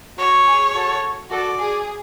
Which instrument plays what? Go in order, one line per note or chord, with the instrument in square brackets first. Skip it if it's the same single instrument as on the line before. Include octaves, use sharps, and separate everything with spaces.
[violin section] F#4 [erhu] C#5
[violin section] G#4
F#4 A4
[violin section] F#4 A4 [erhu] D5
[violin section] G#4